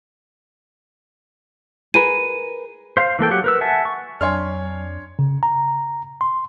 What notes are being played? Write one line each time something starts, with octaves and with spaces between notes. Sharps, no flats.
G#4 A#4 B4 D#7
C5 F5
E3 A#3 A4 G5
F#3 G4 F#5
A#4 B4 E6
E5 F#5 G#5 A5
C#6
F2 F#3 D4 C#5 G#5 C6 F6
C#3
A#5
C6